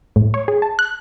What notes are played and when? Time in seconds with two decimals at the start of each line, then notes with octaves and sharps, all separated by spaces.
0.16 A2
0.34 C#5
0.48 G#4
0.62 A5
0.79 F#6